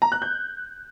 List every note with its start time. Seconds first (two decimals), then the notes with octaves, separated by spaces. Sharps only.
0.02 A#5
0.12 F#6
0.22 G6